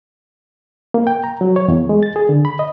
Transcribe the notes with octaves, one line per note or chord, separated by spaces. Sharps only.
A#3
G5
A#5
F#3
C#5
E2
G#3
A6
G#4
D3
B5
D#5